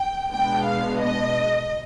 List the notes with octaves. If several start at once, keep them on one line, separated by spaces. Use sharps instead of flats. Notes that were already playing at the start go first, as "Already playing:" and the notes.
Already playing: G5
B2 G#3 B3 D4 G5
F5
D#5